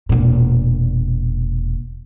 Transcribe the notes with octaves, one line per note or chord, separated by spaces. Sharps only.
E1 A#2